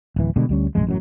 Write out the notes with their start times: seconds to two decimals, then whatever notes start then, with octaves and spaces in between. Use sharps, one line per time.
0.16 D1 E3
0.36 B2 D3 G3 G#3
0.49 D2 G3 C#4
0.75 F1 A#1 F#2 G#3
0.87 A1 F#2 F#3